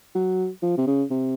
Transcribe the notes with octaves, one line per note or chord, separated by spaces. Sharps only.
F#3
F3
C3
C#3
C3